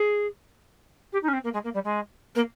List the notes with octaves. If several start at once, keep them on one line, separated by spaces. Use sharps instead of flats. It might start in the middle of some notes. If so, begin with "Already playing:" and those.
Already playing: G#4
G4
D#4
C#4
C4
A#3
G#3
A#3
G3
G#3
A#3